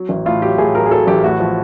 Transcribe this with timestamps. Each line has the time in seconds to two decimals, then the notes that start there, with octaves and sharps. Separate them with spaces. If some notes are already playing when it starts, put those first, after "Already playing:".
Already playing: F#3
0.09 A1
0.26 A2 F4
0.42 F#3 G4
0.58 A2 G#4
0.75 F#3 A#4
0.86 G#4
0.91 F#3 A4
1.07 A1 G4
1.24 A2 F#4
1.40 F3